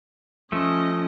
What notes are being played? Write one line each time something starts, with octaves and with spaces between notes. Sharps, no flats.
F3 A3 C#4 D#5